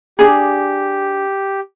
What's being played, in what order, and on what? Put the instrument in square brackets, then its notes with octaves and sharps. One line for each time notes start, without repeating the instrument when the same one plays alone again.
[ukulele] D4 G#4 [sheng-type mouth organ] G4